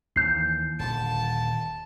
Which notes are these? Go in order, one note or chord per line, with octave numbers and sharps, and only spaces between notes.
D#2 E3 G6 C7
D#1 D3 A5